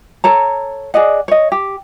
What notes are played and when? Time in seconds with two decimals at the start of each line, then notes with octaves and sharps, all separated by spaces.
0.24 A4 C#5 A#5
0.94 G#4 D5 D#5 F#5
1.28 C#5 D#5
1.52 G4